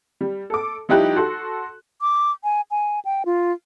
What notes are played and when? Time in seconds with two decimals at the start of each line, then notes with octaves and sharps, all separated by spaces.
0.21 G3
0.50 A4 D6
0.89 F3 G3 D#4 E4 G4 F#6
1.16 F#4 A4 C6
2.01 D6
2.44 G#5
2.71 G#5
3.05 G5
3.26 F4